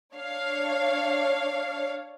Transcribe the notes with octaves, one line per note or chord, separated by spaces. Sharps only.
D4 C#5 F5